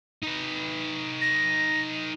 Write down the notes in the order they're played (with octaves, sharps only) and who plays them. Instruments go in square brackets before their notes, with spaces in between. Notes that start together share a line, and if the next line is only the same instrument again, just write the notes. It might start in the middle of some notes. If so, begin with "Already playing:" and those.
[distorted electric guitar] D#4 B4
[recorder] A#6